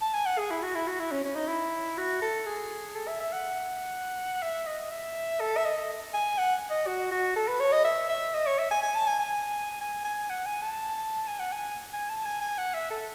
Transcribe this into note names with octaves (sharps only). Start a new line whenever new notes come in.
A5
G#5
F#5
G#4
E4
F#4
E4
F#4
E4
C#4
C#4
D#4
E4
F#4
A4
G#4
A4
E5
E5
F#5
E5
D#5
E5
A4
E5
D#5
G#5
F#5
D#5
F#4
F#4
A4
B4
C#5
D#5
E5
E5
D#5
C#5
E5
G#5
G#5
A5
G#5
G#5
G#5
G#5
F#5
G#5
A5
G#5
F#5
G#5
G#5
A5
G#5
G#5
F#5
E5
A4